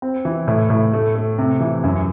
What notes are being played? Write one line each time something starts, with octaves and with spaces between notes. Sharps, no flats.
C4
E3
A2
A2
A3
A3
C3
E3
F#2